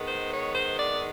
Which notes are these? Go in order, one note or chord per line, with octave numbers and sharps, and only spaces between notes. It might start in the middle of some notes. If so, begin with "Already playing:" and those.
Already playing: D#3 G#3 B3
C5
C#5
C5
D5